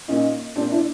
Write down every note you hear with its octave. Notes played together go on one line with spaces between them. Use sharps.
A#2 C#4 D#4
A#2 C4 D4
D4 E4